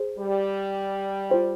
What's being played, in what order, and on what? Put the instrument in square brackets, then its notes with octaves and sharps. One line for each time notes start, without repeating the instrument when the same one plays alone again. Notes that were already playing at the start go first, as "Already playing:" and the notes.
Already playing: [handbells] G#4 C5
[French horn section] G3
[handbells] F4 C5 G5